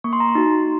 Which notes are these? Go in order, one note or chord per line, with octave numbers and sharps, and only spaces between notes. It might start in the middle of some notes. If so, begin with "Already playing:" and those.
A#3 C#6
C6
A#5
C6
D#4 F#4